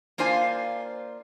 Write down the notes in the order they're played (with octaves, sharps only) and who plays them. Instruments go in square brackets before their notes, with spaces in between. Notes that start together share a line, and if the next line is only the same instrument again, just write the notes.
[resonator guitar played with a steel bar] A#3 D4 F4 C5 G#5